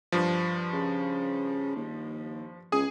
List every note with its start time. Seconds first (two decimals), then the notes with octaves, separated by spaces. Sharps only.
0.12 G2 F3
0.73 C#3
1.76 D#2
2.72 C#2 G#4 D#6